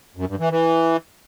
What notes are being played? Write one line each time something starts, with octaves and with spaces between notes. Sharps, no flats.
F#2
G2
E3
E3